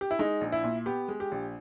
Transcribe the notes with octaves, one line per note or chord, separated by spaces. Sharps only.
G4
E4
G#3 D#4
A#1
E4
A#2
B3 G4
G#3
G4
A#1